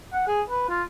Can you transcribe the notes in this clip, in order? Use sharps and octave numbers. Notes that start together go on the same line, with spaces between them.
F#5
G#4
B4
F4